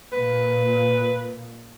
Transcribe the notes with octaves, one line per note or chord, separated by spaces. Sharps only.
A#2 B4